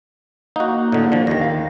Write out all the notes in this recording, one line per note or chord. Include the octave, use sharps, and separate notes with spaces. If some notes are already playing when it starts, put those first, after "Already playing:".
A#3 D#4 F#4
A2 D3
D3 F3
D#2 D#3 A#6
F5